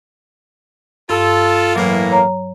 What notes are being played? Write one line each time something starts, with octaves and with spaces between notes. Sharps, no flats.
G2 F4 A4
A2 E3 F#3 A#3
C#5 A#5